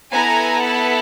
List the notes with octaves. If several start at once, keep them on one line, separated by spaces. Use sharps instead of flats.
B3 E4 A4 G#5 A#5
A5 B5